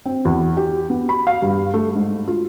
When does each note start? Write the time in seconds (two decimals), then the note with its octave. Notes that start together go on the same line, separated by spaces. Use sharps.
0.05 C4
0.25 E2
0.57 G4
0.90 B3
1.09 B5
1.27 F5
1.42 G2
1.74 A3
1.95 G#2
2.28 F4